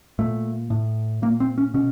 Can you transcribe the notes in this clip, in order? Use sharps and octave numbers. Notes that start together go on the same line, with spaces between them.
A#2 A3
A2
A#2 A#3
C4
C#4
B2 C#4